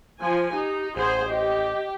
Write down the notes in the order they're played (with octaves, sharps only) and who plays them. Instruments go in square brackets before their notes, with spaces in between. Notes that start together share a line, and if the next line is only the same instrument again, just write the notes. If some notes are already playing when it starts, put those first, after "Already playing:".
[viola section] F3 G#5 [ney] C5
[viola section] D#4 [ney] G4
[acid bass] A1 [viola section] G#4 C5 [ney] F#5
[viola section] G4 [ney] D#5